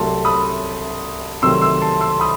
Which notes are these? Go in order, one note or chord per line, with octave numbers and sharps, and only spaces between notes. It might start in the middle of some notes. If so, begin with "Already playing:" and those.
Already playing: C2 C3 F#3 A3 A5 C6
B5 D#6
C2 C3 D#3 F#3 A3 C6 E6
C6 E6
A5 C6
C6 E6
B5 D#6